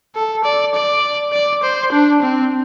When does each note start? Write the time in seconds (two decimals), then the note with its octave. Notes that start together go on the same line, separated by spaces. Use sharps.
0.15 A4
0.44 D5
0.74 D5
1.33 D5
1.63 C5
1.92 D4
2.22 C4